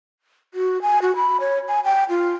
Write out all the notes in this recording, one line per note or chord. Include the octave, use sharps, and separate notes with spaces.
F#4
G#5
F#4
B5
C#5
G#5
G5
F4